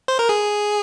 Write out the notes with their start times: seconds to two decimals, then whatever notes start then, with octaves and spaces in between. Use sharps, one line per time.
0.08 C5
0.19 A#4
0.29 G#4